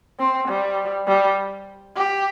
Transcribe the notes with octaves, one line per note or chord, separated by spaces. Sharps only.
C4
G3
G3
G4